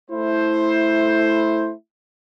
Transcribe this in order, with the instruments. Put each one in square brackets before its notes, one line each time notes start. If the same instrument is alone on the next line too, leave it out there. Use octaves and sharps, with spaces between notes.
[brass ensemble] A3 E4 C5